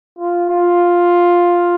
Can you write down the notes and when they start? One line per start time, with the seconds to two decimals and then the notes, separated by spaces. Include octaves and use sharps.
0.18 F4
0.49 F4